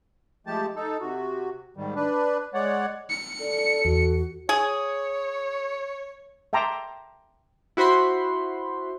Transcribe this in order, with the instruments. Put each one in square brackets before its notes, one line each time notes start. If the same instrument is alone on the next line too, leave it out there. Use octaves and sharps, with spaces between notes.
[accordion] F3 G#3 A3 G4 A5
D#4 A4
C3 F#4
G#2 D#3 G3
D4 B4
G#3 C#5 D5 F#5
[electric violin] C#7
[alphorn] A4 [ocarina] D5
[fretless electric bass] E2 [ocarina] F#4
[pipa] G#4 [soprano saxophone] C#5
[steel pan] E5 G5 A5 A#5 C6 D6
[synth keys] E4 F#4 C5 B5 C6